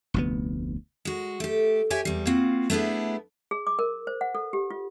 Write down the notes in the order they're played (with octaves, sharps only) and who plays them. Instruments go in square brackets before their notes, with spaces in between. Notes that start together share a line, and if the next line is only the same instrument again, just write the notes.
[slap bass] F1 D2 B3
[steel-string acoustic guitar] G#3 F#4
A3 G4
G4 C#5 E5 G5 G#5
E2 G3
A#3 C4 F4 F#4
A3 B3 D4 E4 G#4
[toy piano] G#4
D6
A#4
C5
F#5
A4
G4
F4